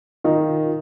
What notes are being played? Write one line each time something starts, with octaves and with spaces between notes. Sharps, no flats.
D#3 D#4 F4